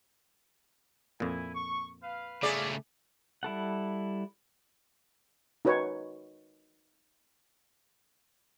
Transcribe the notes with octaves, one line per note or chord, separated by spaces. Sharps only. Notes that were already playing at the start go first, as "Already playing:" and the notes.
F2 A#2 E4 G#5
C#6
B4 F5
C#3 A3 G#4 C#5 D5 E5 F5
G3 E4 A4 F#5
D#4 F#4 B4 C#5